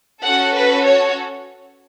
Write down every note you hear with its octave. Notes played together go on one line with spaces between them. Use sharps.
C#4 F#4 A4 F#5
B4
C#5